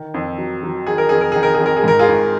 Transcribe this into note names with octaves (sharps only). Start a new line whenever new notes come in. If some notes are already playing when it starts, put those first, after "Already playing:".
Already playing: D#3
F2
F#3
F#3
D#3 G#4
A#4
F2 G#4
A#4
D#3 G#4
A#4
G#4
F2
A#4
G#4
G#2 A#4
F4 G#4
G#1